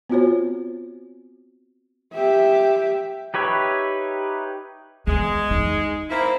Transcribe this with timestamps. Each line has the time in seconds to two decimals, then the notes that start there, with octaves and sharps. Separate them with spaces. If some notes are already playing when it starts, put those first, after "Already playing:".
0.10 B3 C4 F4 F#4 C5 C#5
2.14 G4 E5
3.34 D#4 G4 B4 C#5 E5
5.07 E2 G#3
5.50 D#4
6.09 A#3 C4 E4